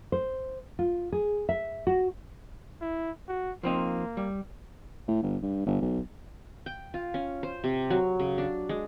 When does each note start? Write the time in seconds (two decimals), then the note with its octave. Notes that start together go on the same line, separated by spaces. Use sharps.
0.12 C5
0.79 F4
1.12 G#4
1.49 E5
1.87 F#4
2.81 E4
3.28 F#4
3.63 F3 A#3 C4 D#4
4.17 G3
5.08 A2
5.22 G1
5.42 G2
5.66 G1
5.81 B1
6.66 G5
6.94 F4
7.14 C#4
7.43 C5
7.64 C3
7.90 F#3
8.20 C#3
8.38 D4
8.69 G#3